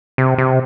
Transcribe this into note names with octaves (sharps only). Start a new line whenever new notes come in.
C3
C3